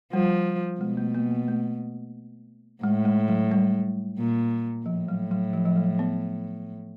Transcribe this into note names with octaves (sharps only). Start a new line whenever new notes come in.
F3 G3
B2 G#3
A3
A#3
A#3
A3
A2 G#3
G#3
F#3
G3
A#2
A2 F3
F#3
F#3
F3
F3
F#3
B3